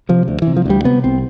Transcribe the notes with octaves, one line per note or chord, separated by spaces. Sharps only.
C3 F3
D2
E3
C3
F3
D2 G3
C3 B3
C2 C4